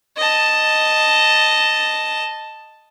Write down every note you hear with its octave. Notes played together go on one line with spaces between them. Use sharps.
D#5 A5